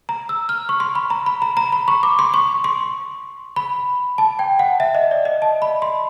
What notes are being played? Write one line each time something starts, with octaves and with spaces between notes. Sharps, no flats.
A#5
E6
F6
C#6
C6
B5
A#5
B5
A#5
A#5
B5
C#6
D6
C6
C#6
C6
B5
A5
G5
F#5
E5
D#5
D5
D#5
A5
B5
C6